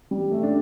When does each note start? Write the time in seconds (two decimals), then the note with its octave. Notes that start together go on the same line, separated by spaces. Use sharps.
0.11 G3
0.31 A3
0.43 D4